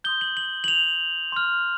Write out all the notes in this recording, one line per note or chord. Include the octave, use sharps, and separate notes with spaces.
C6 D#6 G6 G7
F#7
F#7
F#7
F7
C6 F6